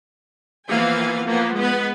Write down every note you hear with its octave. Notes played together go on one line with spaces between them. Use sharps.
E3 F3 A#3 B3 F5 G#5
F3 A#3 B3
G#3 B3 B4